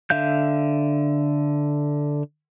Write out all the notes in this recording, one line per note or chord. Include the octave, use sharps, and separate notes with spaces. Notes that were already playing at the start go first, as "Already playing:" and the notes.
D3 E5 F5 G6